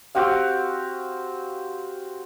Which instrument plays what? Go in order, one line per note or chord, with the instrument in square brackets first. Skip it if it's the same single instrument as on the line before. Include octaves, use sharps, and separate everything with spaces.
[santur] C4 F#4 G4 F5